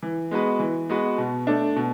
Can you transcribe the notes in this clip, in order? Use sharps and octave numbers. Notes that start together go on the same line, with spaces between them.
E3
G#3 B3 F#4 B4
E3
G#3 B3 F#4 B4
B2
A3 D4
B2